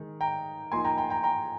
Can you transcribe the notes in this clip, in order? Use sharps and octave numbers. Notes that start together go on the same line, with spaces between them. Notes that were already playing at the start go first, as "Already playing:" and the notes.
Already playing: D#3 G#3
G5 A#5
F3 A#3 D#4 G#5 C6
G5 A#5
G5 A#5
G5 A#5
G5 A#5